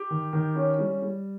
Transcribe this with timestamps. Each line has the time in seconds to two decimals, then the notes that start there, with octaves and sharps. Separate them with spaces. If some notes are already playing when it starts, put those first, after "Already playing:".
Already playing: G4
0.10 D#3
0.33 D#3
0.55 C#4
0.79 G3
1.02 G3